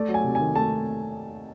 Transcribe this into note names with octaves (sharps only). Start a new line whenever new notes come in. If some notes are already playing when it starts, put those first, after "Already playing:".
Already playing: A3 D5
F#3
G#5
C3
D#3 G#5
A3 A5